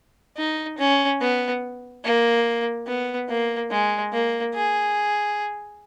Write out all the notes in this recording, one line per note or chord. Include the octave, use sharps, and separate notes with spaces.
D#4
C#4
B3
A#3
B3
A#3
G#3
A#3
G#4